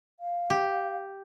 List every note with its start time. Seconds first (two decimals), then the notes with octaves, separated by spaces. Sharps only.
0.20 F5
0.50 G4